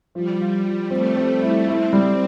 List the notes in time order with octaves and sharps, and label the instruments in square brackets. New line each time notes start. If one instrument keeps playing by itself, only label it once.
[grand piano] F3 [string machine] G3
[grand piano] F4
F3
[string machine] A3 [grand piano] C4
[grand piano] C4
E4
[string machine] C4 [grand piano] E4
[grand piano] G3